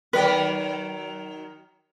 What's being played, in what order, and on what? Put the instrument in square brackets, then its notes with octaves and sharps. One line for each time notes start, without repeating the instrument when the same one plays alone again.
[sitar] D#3 F#3 A#4 [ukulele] B4